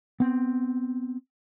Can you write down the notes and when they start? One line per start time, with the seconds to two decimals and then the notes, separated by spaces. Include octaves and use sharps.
0.20 B3 C4